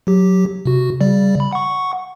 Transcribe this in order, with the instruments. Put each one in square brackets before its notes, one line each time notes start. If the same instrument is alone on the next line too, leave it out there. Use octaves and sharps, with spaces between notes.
[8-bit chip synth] F#3 G4
C3 F#4
C#3 G3 D5
B5
F#5 C#6